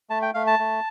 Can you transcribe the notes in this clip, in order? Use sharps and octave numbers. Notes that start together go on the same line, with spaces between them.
A3 A5
G5
A3 F5
A5
A3